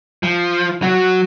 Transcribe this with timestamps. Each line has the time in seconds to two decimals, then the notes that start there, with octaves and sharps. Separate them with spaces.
0.23 F3
0.82 F#3 F#4